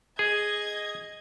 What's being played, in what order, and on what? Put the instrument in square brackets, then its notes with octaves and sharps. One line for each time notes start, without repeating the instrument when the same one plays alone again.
[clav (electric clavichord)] G#4 [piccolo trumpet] D#5 [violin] G#6